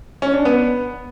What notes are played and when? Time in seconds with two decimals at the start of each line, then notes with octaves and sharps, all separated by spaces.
0.22 C#4
0.34 D4
0.45 B3